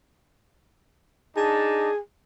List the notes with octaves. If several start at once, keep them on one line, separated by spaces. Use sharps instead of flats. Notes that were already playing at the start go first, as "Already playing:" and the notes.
D4 D#4 G#4 A5